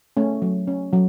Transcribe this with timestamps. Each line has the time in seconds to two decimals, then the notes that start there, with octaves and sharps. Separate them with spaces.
0.17 A3 C#4
0.42 F#3
0.68 C#4
0.93 F#3